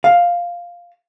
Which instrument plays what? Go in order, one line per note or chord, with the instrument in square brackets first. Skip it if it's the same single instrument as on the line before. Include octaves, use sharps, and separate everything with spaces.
[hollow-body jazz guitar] F5